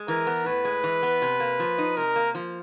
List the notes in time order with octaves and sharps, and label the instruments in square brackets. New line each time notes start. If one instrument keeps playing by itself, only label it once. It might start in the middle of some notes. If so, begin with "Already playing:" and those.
Already playing: [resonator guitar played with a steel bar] G#3
[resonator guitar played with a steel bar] E3 [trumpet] A#4
[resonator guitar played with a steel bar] B3
[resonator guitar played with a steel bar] A2 [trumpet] B4
[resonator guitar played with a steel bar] G#3
E3
B3
C3
A#3
F3
D#4
[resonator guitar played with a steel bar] C3 [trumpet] A#4
[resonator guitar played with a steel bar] A#3
F3